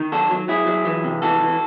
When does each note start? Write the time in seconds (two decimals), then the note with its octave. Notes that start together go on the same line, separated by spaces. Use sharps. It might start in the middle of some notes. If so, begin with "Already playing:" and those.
Already playing: D#3
0.12 F#3 F#4 A4
0.31 F#3
0.48 F#3 E4 G#4
0.67 F#3
0.85 E3
1.04 C3
1.22 E3 F#4 A4
1.41 E3